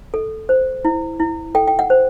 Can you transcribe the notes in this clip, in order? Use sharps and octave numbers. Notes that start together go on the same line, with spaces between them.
A4
C5
E4
E4
A4 G5
G5
F#5
C5